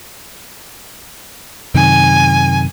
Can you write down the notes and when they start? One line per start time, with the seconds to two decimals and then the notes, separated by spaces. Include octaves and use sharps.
1.74 F#2 C3 D#3 G#5